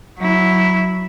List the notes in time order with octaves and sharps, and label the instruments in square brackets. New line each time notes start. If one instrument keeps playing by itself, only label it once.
[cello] F#3 E4